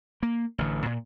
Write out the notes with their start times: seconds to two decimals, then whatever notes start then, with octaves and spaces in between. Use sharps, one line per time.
0.23 A#3
0.58 A1 D3
0.86 A#2